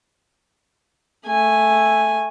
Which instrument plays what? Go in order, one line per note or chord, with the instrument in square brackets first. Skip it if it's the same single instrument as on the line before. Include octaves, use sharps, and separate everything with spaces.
[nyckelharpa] A3 G#5